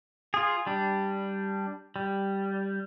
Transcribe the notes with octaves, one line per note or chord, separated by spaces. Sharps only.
F4 G#4
G3 D4
G3